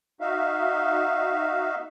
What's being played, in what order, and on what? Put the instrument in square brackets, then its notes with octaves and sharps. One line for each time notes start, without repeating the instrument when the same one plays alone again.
[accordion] D#4 F#4 E5 F5